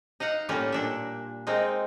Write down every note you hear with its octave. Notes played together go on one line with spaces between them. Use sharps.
D#4 D#5 F5 F#5
A2 G3 A#3 C#4 F4
A#2 D4 E5
G#3 A#3 C4 D#4